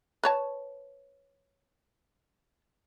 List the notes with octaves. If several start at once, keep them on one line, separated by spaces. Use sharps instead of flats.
B4 C#5 A5